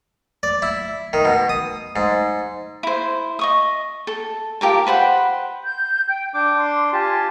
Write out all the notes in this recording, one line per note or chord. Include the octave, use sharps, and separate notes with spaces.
D5
E4
D#3
B2
D#6
G#2
E4 C5
D#5 C#6 D#6
A4
F4 G4 A#4 A5
B4 C5 F#5 G5
G6
G5
D4 D6 G6
C6
F4 G4 G#5 A5